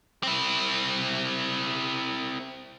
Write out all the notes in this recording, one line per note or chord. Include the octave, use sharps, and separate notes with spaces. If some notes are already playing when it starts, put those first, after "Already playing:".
C4 E4